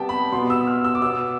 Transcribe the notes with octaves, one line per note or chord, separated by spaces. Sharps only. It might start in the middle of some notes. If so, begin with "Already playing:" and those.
Already playing: C3 G3 B3 G5 A5
B5
B2 B3 C6
E6
F6
E6
D6
B2 B3 E6